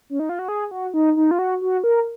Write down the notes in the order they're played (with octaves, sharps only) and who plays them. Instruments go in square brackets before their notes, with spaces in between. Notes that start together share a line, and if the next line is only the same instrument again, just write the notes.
[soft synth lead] C#4
D#4
F4
F#4
G#4
F#4
D#4
D#4
F4
F#4
F#4
A#4